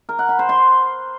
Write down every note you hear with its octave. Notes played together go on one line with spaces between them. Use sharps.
A#4
F#5
B5
C5
C6